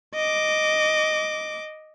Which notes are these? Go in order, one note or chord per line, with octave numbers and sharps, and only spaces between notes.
D#5 D6